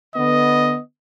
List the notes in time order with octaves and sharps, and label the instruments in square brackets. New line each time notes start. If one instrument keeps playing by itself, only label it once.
[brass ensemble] D3 B3 [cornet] D#5